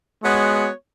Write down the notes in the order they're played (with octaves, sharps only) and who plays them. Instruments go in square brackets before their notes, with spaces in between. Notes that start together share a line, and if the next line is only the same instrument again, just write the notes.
[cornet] G#3 [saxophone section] B3 F#4 C#5